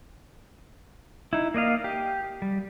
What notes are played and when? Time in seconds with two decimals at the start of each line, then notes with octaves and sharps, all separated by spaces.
1.33 D#4 E4
1.54 A#3 D5 D#5 F5
1.84 G4
2.42 G3